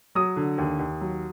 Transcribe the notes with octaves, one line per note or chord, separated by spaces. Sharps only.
F#3 D#6
D3
D#2
D#2
F#3